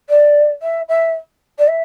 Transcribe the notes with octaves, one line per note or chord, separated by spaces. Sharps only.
D5
E5
E5
D5
E5